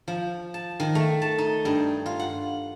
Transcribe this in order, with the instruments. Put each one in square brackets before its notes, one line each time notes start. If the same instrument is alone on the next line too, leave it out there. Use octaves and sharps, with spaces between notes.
[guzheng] F3
A5
D#3
A3
A5
D#4
G2
F4
F#5